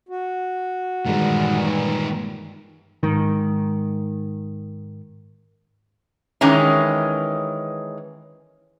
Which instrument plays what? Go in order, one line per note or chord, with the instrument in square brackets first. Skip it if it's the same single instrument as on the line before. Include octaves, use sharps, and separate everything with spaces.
[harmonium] F#4
[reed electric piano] G2 G#3 [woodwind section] A#2 E3 [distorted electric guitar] D#3 G3
[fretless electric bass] G#2 D#3
[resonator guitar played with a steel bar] D#3 E3 G#3 C#4